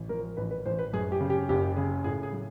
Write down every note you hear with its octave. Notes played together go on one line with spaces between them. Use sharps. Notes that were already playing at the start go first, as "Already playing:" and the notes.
Already playing: A1
F3 A#4
A1 B4
B4
A1 C5
B4
F#2 G#4
G4
C#3
G4
F#1 G4
C#3 G#4
A2 G#4
G#4
F#3